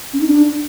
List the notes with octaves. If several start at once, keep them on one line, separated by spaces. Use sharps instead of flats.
C#4
D#4
D4